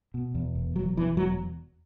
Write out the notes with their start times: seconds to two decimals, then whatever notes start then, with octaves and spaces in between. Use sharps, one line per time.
0.14 B2
0.35 E2
0.55 E1
0.76 E1 F#3
0.96 E2 E3
1.17 E1 F#3